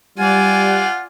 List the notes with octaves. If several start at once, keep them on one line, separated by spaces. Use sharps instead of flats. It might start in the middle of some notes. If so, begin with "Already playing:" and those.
G3 F4 D5 F#5 G#5